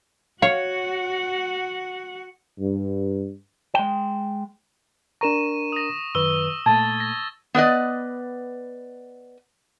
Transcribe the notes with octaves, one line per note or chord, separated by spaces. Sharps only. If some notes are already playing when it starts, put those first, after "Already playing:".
F#4 C#5 F5 F#5
G2
G#3 G5
D4 A#4 A#5 C#6 D#7 E7
D#6 A#6
F#2 D#3 B4 C#6 E6 G7
A#2 A3 A5 G#6 A6
A#6
B3 B4 D5 D#5